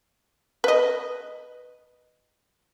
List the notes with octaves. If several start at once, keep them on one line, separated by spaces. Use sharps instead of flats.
B4 D#5